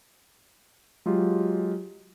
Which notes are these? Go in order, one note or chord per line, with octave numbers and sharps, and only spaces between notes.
F#3 G#3 F4 G4